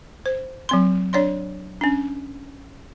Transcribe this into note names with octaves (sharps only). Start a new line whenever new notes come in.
C5
F#3 C4 C6
D4 C#5 D5 C6
C#4 D4